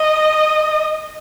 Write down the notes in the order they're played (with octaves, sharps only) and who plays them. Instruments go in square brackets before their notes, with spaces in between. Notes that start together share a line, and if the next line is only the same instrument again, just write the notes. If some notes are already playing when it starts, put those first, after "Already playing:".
Already playing: [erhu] D#5